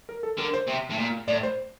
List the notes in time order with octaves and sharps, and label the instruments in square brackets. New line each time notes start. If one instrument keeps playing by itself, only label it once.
[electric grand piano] A#4
A4
[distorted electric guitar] D3 [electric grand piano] A#4
[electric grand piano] C5
[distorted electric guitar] C3
A2
A#2
[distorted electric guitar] A2 [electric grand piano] D5
[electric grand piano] C5